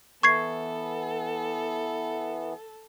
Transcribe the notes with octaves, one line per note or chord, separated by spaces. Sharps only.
E3 B3 A4 C#6 G#6 C7